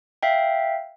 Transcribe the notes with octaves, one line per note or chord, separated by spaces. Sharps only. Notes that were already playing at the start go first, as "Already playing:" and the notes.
E5 F5 G5